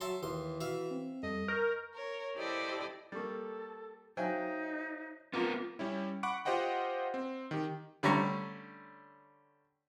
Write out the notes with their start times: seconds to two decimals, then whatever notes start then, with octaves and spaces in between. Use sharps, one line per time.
0.01 F#3 E5 A5 C6
0.23 D#2 E3 C6
0.61 F#4 E5 F5
0.91 C4
1.23 F2 G3 A4 D#5
1.48 A#4 C#6 G6
1.94 A#4 C#5
2.36 E4 G4 A4 C5 D5 D#5
3.12 G3 A#3 A4 C#6 A6
4.17 F#3 D#4 C5 E5 F5 G5 G#5
5.33 F3 B3 C4 F4 A#4 D6
5.79 G3 C#4 E4
6.23 F#5 B5 C#6 D6 F#6 D7
6.45 F4 G4 C5 D#5 F#5 G5
7.14 C4
7.51 D#3 G4
8.03 D3 G3 A3 C#4 A#5 C#6